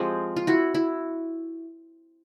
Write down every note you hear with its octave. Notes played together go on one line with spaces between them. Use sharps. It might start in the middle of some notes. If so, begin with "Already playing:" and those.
Already playing: F3 G#3 C4 F4 G4
F4
E4 F#4
E4